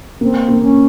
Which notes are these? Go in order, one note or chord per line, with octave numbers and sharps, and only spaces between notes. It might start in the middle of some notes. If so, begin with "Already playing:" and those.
A#3 C4
A#3
C#4